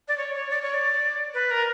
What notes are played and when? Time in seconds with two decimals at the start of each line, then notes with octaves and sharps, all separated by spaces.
0.08 D5
0.18 C#5
0.34 C#5
0.50 D5
0.62 C#5
0.74 D5
1.34 B4
1.51 A#4